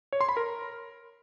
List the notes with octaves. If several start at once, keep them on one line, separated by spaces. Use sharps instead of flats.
C#5
C6
B5
A#4